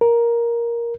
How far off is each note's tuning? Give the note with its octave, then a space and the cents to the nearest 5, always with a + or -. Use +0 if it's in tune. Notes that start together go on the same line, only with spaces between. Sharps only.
A#4 +10